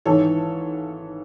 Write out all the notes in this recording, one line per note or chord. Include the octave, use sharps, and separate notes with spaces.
G#1 G#2 E3 A4 C#5